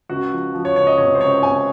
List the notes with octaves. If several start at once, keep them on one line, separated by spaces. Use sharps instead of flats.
C#2 F#4
F3
F3
C#5
C#2 C#5
D#5
C3 C#5
C5
C#2 C#5
C3 G#5